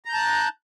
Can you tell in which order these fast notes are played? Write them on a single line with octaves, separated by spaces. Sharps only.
A#5 G6 A5 F#6